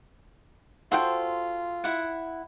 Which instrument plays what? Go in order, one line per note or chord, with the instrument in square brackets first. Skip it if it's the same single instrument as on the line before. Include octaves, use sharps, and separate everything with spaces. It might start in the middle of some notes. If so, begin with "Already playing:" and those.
[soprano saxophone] F4 [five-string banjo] F#4 C5 G5 [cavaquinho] A4
[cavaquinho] E4 F#5